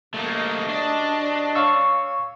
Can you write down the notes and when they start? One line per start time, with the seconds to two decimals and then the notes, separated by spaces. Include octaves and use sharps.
0.14 C3 A3 A#3 F#4 D#5
0.69 D4
1.55 C#5 F5 C#6 E6